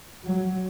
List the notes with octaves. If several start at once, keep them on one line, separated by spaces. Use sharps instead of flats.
F#3